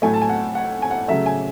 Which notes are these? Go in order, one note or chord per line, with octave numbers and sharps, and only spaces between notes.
A2 F#3 A3 G#5
A5
G#5
F#5
F#5
G#5
F#5
C#3 F#3 A3 E5
G#5